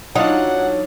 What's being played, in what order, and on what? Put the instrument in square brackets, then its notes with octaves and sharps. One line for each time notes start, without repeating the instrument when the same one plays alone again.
[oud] F#3 D#4 [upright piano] D4 F4 D#6 [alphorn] C#5 [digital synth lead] F#5